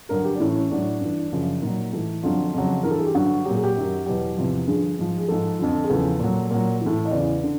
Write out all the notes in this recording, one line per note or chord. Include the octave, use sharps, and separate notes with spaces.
G2 D3 F#3 A#4
G4
D4
A2 E3 C#4
C#4
A2 F#3 D4
G2 E3
F#2 C#3 F3
A#2 F#3 D#4
A2 E3
F2 D3 F#3 F4
F2 C#3 F#3
G2 E3 A#4
A4
G#4
G4
G2 D3 F#3 F#4
A#2 F#3 G4 G#4
G4
F#2 D#3 F#3
E2 B2 F#3 G4
E2 C3 F3
G2 D3 F3 G#4
G#2 F3
G#4
G#2 F3 A4
F2 D3 F3
G#4
E2 C#3 F3 A4
A#2 F#3
A#2 F#3
A2 E3
D#5
E2 C#3 E3 D5
D3